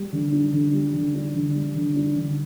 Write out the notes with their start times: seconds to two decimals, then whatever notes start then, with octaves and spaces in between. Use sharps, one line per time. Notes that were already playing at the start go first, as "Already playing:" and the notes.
Already playing: G3
0.12 D3
0.32 D4
0.53 D3
0.73 G3
0.93 D3
1.14 D4
1.35 D3
1.55 G3
1.75 D3
1.96 D4
2.16 D3